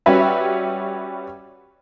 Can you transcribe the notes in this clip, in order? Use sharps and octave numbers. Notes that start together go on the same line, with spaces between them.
G3 C#4 F#4 B4 E5